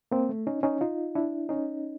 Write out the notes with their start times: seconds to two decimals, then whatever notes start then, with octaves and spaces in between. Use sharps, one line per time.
0.12 A#3 C4
0.29 A3
0.47 C#4 D#4
0.63 C#4 D#4
0.81 D#4 F4
1.15 D4 E4
1.49 C#4 D#4